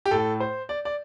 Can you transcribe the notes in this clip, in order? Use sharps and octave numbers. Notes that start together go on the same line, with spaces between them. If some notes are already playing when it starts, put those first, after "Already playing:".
G4
A2 A4
C5
D5
D5